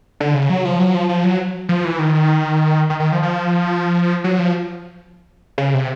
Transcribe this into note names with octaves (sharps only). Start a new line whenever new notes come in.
D3
C#3
F#3
F3
F#3
F3
F3
F#3
F3
E3
D#3
D#3
D#3
F3
F3
F#3
F3
C#3
C3